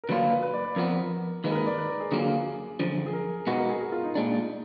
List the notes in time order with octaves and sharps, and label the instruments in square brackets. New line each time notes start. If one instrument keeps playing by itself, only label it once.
[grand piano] A#4
[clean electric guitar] D3 F#3 A#3 D4 F4 [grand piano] B4
[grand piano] B4
B4
D5
B4
[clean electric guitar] F2 F3 B3 [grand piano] A#4
[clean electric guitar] D#2 D#3 G#3 [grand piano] B4
[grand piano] A#4
B4
D5
B4
A#4
G#4
[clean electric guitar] D3 F#3 A#3 F4 [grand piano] G#4
[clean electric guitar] F#2 D3 F3
[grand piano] G#4
A#4
[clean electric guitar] B2 G#3 D#4 F#4 [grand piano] B4
[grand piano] A#4
G#4
G#4
F4
D#4
[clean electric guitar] A#2 G#3 D4